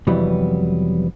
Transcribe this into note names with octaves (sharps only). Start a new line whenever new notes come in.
F2 C3 E3 F#3 G3 B3